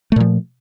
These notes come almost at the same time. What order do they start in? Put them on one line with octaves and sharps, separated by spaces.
A3 A#2 F3